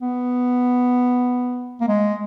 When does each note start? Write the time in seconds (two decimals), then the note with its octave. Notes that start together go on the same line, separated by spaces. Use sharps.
0.02 B3
1.81 A#3
1.88 G#3